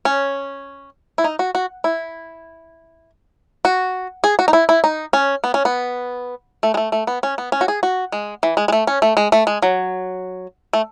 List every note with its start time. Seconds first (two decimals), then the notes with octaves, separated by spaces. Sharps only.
0.05 C#4
1.18 E4
1.24 D#4
1.39 F#4
1.55 F#4
1.84 E4
3.65 F#4
4.24 G#4
4.39 F#4
4.48 D#4
4.53 E4
4.69 E4
4.84 D#4
5.13 C#4
5.44 B3
5.54 C#4
5.65 B3
6.63 A3
6.74 G#3
6.77 A3
6.92 A3
7.07 B3
7.23 C#4
7.38 B3
7.52 C#4
7.61 F#4
7.68 G#4
7.83 F#4
8.12 G#3
8.43 E3
8.57 G#3
8.68 G#3
8.72 A3
8.87 C#4
9.02 A3
9.17 G#3
9.32 A3
9.47 G#3
9.62 F#3
10.73 A3